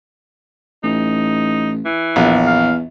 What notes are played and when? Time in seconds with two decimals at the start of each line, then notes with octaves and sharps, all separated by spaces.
0.84 A1 D#4
1.85 E3
2.16 A#1 E2
2.47 F5